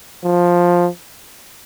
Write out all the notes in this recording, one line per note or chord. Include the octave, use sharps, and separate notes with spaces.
F3